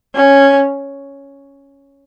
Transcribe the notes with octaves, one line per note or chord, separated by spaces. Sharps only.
C#4